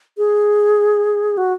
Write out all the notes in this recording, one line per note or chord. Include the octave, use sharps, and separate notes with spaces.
G#4
F#4